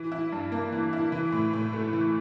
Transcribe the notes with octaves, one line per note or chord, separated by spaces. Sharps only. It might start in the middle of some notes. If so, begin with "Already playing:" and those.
Already playing: E3
E4
G2
A#3
E3
E4
E3
A2
A2
A3
E3